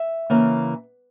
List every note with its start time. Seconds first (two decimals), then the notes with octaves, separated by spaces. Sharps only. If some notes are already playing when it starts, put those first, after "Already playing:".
Already playing: E5
0.30 C#3 E3 A#3